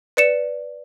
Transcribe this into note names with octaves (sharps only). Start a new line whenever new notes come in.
B4 D5 C#7 E7